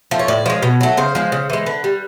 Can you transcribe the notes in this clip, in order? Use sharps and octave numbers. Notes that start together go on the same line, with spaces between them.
F3 A3
C#5
A2 D5
F3 G#3 C#5
B2
F#3 A3
C#3 C5
F3 G#3
C#3
E3 G#3
D3 B4
G3